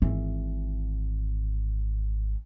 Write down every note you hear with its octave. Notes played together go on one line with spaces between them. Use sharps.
G#1 E3